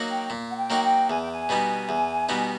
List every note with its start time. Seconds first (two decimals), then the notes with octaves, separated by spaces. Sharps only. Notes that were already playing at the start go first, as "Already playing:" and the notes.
Already playing: F#3 A#3 D#4 F#4
0.10 G5
0.30 A#2
0.50 F#5
0.57 G5
0.70 F#3 A#3 D#4 F#4
0.83 G5
1.10 E2 G#5
1.20 G5
1.31 G#5
1.49 B2 G3 B3 D#4
1.89 E2
2.29 B2 G3 B3 D#4